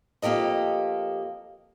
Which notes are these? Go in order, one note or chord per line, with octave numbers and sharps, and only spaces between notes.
F2 A#3 G4 A4 D#5